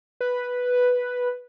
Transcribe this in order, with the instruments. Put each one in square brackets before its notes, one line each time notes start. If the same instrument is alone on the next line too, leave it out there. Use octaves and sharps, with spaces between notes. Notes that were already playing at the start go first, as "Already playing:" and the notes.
[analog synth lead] B4